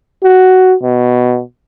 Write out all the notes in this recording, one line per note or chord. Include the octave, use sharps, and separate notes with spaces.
F#4
B2